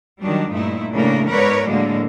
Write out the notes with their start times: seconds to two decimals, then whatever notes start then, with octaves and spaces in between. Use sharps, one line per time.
0.21 D#3 F#3 G3 D4
0.50 G2 A#2 A3 D#4 E4
0.94 A2 C#3 A#3 D4 A#4
1.29 G#2 B3 A#4 B4 C#5 D5
1.68 A2 D3 F#3 G#3 A#3